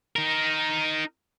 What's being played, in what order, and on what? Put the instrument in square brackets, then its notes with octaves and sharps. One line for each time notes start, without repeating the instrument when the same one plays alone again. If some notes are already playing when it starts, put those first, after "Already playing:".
[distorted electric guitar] D#4 A#4